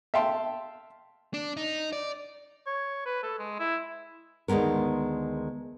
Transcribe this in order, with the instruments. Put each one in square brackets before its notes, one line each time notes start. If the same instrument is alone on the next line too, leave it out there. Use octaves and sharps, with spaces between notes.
[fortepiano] E5 F5 G5 A5 C6
[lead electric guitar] D4
D#4
D5
[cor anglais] C#5
B4
A4
G#3
E4
[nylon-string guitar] D2 D#3 G#3 B3 A#4